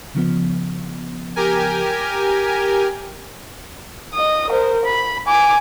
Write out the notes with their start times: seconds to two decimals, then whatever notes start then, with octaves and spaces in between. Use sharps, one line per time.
0.15 C#3 F3 B3
1.36 G4 A#4 G#5
4.14 D#5 D#6
4.50 A#4 C5
4.85 B5
5.27 G#5 D6